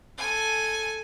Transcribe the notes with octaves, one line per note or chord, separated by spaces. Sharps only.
A4 G#5